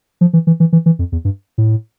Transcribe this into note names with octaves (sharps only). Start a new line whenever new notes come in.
F3
E3
E3
E3
E3
E3
F2
E2
G2
A2